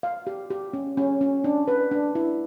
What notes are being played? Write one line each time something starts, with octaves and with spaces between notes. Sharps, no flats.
F5
G4
G4
C#4
C#4
C#4
D4
B4
D4
E4